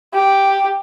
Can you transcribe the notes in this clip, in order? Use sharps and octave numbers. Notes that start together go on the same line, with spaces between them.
G4